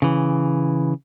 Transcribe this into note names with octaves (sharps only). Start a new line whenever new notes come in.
C#3 E3